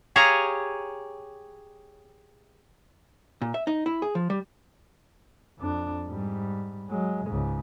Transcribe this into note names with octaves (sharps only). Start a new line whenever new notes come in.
G4 G#4 C#5 F5 A#5
A#2
E5
D#4
E4
G#4
F3
G3
F2 D4
G#2 G3
F#3 G#3
C#2 G#2